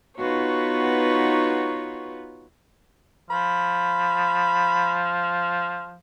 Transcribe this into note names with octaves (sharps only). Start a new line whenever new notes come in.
B3 D#4 F4 F#4 B4 C#5
F3 B5